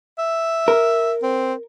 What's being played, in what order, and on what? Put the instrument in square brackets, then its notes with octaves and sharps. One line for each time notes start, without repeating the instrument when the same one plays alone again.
[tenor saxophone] E5
[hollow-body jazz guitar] A#4
[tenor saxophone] C4